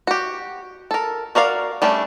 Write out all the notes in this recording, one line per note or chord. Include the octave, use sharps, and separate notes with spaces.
F#4 G4
A4 A#4
F#4 A#4 D5 F5
G3 A3 C#4 D4